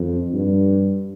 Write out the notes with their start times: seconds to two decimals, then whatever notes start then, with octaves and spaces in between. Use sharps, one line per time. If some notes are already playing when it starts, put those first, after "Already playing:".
Already playing: F2
0.34 G2